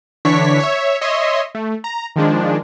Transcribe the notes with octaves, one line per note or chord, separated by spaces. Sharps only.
D3 E3 D4 C#5 C#6 B6
C#5 E5
C#5 D#5 E5 C6
A3
A#5
D#3 F3 G#3 D4